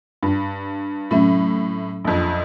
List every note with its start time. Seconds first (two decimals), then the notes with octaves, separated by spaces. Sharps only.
0.23 G2
1.11 A2 C3 F#3 C#4 E5
2.05 A#1 F2